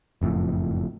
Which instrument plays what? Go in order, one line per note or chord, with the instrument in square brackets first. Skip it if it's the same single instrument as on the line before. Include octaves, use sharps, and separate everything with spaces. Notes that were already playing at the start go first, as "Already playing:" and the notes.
[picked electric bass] F#1 F2 A2